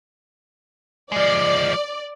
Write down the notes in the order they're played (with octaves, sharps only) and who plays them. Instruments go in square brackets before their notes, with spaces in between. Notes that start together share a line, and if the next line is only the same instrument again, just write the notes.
[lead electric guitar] F3 G#3 [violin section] D5